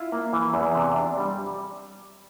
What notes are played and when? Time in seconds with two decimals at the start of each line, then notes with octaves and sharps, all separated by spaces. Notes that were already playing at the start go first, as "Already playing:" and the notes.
Already playing: E4 F4
0.12 A#3
0.33 E3
0.54 E2
0.75 C3
0.96 D4
1.18 G3